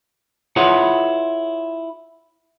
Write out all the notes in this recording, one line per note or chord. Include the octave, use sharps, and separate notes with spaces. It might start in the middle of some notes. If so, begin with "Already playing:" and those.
E4 F4 G#4 B4 C#5 F#5